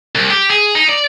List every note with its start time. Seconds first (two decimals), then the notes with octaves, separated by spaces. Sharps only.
0.15 C2
0.31 G4
0.50 G#4
0.75 D#4
0.89 D5